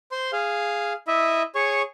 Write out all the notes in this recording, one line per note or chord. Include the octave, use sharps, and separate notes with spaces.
C5 C6
G#4 F5
E4 D#5 E5
G#4 C#5 C#6